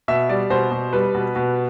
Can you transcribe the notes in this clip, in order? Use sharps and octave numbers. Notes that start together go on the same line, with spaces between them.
B2 E5
G3 D5
B2 C5
B2
G3 B4
B2
B2